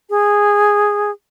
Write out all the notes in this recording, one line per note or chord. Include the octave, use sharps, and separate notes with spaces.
G#4